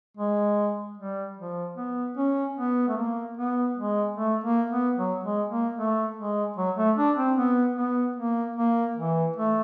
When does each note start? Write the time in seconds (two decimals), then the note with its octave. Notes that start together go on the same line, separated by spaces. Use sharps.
0.17 G#3
0.98 G3
1.37 F3
1.77 B3
2.17 C#4
2.57 B3
2.88 A3
2.97 A#3
3.37 B3
3.78 G#3
4.17 A3
4.44 A#3
4.70 B3
4.97 F#3
5.24 G#3
5.50 A#3
5.78 A3
6.16 G#3
6.57 F#3
6.76 A3
6.97 D4
7.17 C4
7.37 B3
7.77 B3
8.16 A#3
8.56 A#3
8.97 E3
9.36 A3